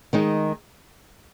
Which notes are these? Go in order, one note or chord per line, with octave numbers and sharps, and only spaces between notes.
D#3 G#3 D#4